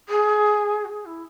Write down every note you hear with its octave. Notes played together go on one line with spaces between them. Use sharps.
G#4
F#4
G#4
E4